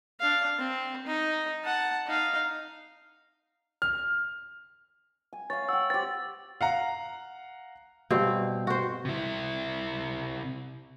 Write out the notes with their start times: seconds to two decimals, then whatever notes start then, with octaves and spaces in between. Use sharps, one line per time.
0.20 D4 F5
0.58 C4
1.07 D#4
1.64 F#5 A5
2.07 D#4 F5
3.82 F6
5.33 G#5
5.50 C#5 F5 A6
5.69 F#5 G5 E6
5.90 G4 C5 A6
6.61 F5 F#5 A#5
8.11 G2 B2 C4
8.67 F#4 C5
9.05 C3 E4